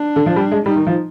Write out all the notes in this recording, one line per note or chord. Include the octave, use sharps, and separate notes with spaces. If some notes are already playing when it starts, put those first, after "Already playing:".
Already playing: D4
D3
F3
G3
G#3
G3 D#4
D#3
F3